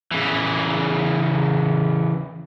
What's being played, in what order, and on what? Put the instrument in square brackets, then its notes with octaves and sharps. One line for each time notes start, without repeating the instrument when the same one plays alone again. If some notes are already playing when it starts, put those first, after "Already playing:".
[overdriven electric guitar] C#3 E3